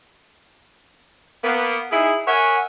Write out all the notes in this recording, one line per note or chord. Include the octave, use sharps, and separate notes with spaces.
A#3 B3
D#4 E4 G#4
A#4 C#5 E5 F#5 G#5